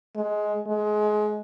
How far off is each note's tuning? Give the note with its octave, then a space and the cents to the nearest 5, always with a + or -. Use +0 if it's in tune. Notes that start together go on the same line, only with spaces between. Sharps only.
G#3 +15
G#3 +25